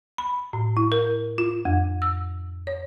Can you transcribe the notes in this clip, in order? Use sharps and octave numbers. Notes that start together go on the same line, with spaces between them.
B5
A2
E4
A#4
F4
F2
E6
C#5